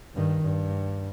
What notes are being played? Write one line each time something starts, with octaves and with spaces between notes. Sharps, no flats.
G2 D#3
G2